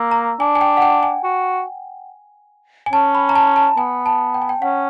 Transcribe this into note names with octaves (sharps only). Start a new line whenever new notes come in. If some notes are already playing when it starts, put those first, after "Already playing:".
Already playing: A#3 E6
A#5
D4 G#5
G#5
G5
F#5
G5
G#5
F#4
G#5
C#4 A5
B5
A#5
A5
A5
B3 G#5
A5
G5
G#5
G5
C#4 F#5